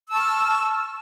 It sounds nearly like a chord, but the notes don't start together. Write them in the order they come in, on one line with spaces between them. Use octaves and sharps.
E6 A5 C#6 F6